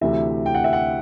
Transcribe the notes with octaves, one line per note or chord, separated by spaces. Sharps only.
D2 C3 E3 E5
G5
F#5
E5
F#5